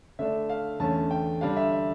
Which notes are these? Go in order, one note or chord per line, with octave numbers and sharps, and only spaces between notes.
D3 A3 D4 E5
F5
E2 D3 A3 C#4 A5
G5
D3 G3 D4 F5
E5
E5